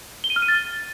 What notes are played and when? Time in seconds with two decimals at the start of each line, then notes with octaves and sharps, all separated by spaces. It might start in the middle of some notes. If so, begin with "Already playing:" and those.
0.24 G7
0.30 D#7
0.36 F6
0.42 D#7
0.48 A6